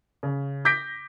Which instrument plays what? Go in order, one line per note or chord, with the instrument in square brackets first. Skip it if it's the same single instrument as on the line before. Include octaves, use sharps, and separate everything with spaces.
[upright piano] C#3
D6 G6 A#6 B6 D7